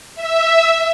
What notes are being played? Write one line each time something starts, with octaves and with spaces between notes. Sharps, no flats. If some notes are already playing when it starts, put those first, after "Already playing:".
E5